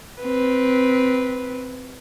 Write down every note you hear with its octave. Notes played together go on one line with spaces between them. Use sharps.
C4 B4